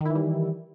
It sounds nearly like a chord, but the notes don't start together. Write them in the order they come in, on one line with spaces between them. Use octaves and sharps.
D#3 E4 E3 G3